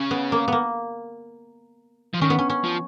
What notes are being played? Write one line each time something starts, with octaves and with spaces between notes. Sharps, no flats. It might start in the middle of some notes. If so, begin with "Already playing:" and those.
Already playing: C#3
B3
A#3
A#3 B3
F3
D#3 C#4
B3
C#4
C#4
F3